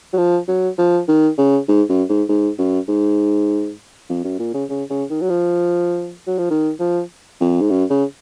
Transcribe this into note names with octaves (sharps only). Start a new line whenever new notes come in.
F#3
F3
F#3
F3
D#3
C#3
G#2
F#2
G#2
G#2
F#2
G#2
F2
F#2
A#2
C#3
C#3
C#3
D#3
F#3
F3
F#3
F3
D#3
F3
F2
G#2
F#2
C#3